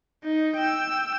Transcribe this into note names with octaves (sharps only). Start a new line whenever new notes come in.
D#4
G5 E6